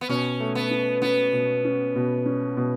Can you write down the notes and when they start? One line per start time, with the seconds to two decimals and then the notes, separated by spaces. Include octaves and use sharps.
0.01 B3
0.09 B2 C#4
0.40 A3
0.55 B3
0.71 C#4
1.02 B3 C#4
1.33 B2
1.65 C#4
1.96 B2
2.26 C#4
2.57 B2